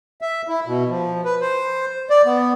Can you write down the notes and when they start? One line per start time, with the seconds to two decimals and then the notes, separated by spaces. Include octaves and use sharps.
0.21 E5
0.48 E4
0.66 B2
0.89 F3
1.25 B4
1.41 C5
2.10 D5
2.26 B3